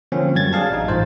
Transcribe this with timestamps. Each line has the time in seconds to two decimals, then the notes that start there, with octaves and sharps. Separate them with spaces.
0.12 D3 F3 A#3 C4 C#4
0.35 F#2 F#3 G3 G#6 A6
0.53 D4 G4 G#4 F5 A5
0.70 A1 D#4
0.88 A1 G#2 F4 C5